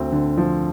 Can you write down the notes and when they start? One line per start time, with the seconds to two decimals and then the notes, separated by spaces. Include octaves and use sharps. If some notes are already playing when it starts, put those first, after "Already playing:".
Already playing: D2 C4
0.12 D3
0.38 F3